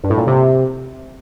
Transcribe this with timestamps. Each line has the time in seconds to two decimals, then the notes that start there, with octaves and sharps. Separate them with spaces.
0.04 G2
0.10 A2
0.18 A#2
0.27 C3